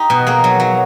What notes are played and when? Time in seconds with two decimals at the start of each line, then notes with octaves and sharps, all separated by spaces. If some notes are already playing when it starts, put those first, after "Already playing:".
Already playing: D#4 G4
0.10 B2
0.27 A#3 G#4
0.44 F#3
0.60 F#3